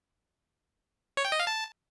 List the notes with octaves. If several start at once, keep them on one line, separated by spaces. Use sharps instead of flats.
C#5
G5
D#5
F5
A5